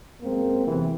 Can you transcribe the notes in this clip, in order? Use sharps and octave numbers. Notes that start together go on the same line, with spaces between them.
F#2 G#3 A#3 C4
E2 C3 E3